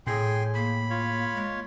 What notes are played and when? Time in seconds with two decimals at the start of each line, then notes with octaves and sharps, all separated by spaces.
0.07 A2 G#4 G5 G#5 C6
0.55 A#3 B5
0.90 F4 C#5
1.35 G#3